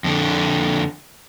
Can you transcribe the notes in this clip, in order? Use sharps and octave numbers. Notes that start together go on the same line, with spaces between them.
F2 D3